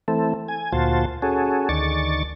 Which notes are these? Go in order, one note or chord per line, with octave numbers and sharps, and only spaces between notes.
E3 A3 C4 A4
G#5
D2 A#2 F4 F#4 C5 A5
C#4 F#4 G#4 A4
D2 D#3 D5 C#6 A6